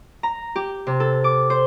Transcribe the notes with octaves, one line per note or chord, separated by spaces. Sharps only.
A#5
G4
C3
A4
D6
C5